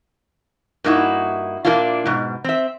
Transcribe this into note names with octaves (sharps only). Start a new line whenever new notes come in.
G2 A#3 D#4 E4 F#4
A#2 A#3 D4 E4 F4
G#2 B2
C4 E5